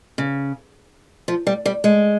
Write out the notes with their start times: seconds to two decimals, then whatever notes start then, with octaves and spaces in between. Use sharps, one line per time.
0.18 C#3
1.28 F3
1.47 G3
1.66 G3
1.84 G#3